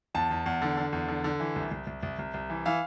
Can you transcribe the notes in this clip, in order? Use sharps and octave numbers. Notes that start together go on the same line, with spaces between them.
E2 A5
E2
E2
D3
D3
E2
D3
D3
E3
C2
C2
C2
C2
C2
C2
E3
E3 F5